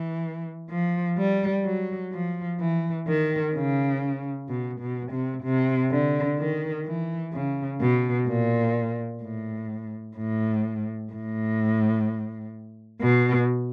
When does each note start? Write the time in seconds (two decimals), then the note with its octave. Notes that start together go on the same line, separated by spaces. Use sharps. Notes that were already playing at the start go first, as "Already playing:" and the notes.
Already playing: E3
0.70 F3
1.17 G3
1.65 F#3
2.12 F3
2.60 E3
3.08 D#3
3.55 C#3
4.49 B2
4.80 B2
5.12 C3
5.43 C3
5.91 D3
6.39 D#3
6.85 E3
7.33 C#3
7.81 B2
8.28 A#2
9.22 A2
10.17 A2
11.12 A2
13.01 B2